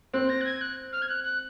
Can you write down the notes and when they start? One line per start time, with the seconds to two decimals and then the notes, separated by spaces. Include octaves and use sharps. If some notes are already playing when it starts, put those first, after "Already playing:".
0.14 C4 F#6
0.29 A#6
0.41 F#6
0.45 G#6
0.61 F#6
0.93 F6
1.02 G#6
1.09 F#6
1.24 F#6